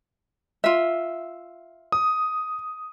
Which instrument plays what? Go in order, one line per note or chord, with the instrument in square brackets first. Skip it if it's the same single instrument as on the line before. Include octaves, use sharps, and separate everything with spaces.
[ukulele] F4 E5
[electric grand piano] D#6